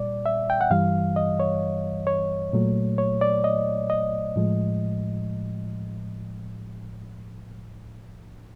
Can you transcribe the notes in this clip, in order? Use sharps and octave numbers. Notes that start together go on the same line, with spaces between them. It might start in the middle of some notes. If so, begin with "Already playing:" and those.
Already playing: A#2 G3 D5
E5
G5
F#5
G2 E3 G3 F5
D#5
C#5
C#5
A#2 F#3 A3
C#5
D5
D#5
D#5
A2 F3 G#3